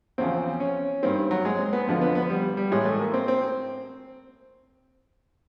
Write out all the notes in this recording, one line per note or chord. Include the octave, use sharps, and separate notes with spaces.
E2 C#3 F3 C4
C#4
G2 D#3 C4
F#3
G#3
C4
B3
F2 D3 F3
B3
B3
G3
G3
A2 E3 G#3
A3
A#3
C4
C4